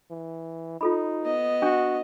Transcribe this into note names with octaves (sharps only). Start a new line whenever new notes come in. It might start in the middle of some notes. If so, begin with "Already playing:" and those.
E3
D#4 F4 A4 B5
B3 D#5
D4 F#4